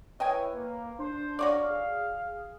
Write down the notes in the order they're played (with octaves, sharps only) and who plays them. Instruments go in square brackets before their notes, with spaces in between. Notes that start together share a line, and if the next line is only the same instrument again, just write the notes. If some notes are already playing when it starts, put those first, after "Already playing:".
[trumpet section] E4 C#5 [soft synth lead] B4 [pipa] D#5 G5 G#5
[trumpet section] A#3
[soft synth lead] D4 [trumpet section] C5
[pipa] F#4 C#5 D5 [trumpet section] F5
[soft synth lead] G#4